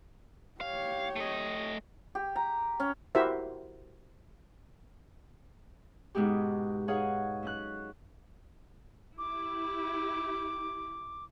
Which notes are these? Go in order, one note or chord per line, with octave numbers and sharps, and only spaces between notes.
G4 C#5 F5
A3 D#5
G4
A#5
C#4
E4 F#4 G4 A#4 C5 E5
G#2 B2 G#3 F#4 G4
D#4 G#4 C#5 F5 F#5 G#5
F#2 C#4 F#6
E4 G4 D6